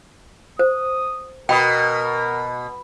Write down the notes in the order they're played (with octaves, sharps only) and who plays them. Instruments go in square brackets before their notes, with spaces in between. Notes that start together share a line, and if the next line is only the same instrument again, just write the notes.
[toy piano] C5 [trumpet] D#6
[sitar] B2 [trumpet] A#4 [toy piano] G5 B5 D#6